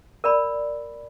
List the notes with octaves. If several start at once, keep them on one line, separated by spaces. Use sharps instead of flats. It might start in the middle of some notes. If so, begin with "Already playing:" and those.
A#4 D5 B5